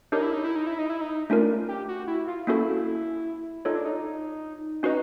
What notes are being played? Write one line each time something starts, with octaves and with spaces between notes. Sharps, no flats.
D4 D#4 G4 A#4 C#5
E4
D#4
E4
D#4
E4
D#4
E4
D#4
A3 C#4 D4 F4 A#4
G4
F#4
E4
F4
A#3 C#4 E4 F#4 A4
D#4 F4 A4 C#5
D4
D#4
C#4 D#4 F#4 B4 D#5